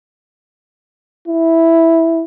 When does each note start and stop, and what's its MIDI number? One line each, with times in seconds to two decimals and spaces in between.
1.28 2.25 64